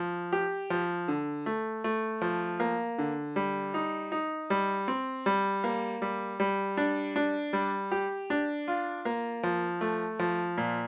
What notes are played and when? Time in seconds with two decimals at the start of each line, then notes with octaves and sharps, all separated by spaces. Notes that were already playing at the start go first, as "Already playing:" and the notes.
Already playing: F3
0.33 G4
0.70 F3
1.08 D3
1.46 A3
1.84 A3
2.22 F3
2.60 A#3
2.98 D3
3.36 G3
3.74 D#4
4.12 D#4
4.50 G3
4.88 C4
5.26 G3
5.64 A#3
6.02 G3
6.40 G3
6.77 D4
7.16 D4
7.53 G3
7.92 G4
8.30 D4
8.68 F4
9.05 A#3
9.43 F3
9.81 A3
10.19 F3
10.58 A#2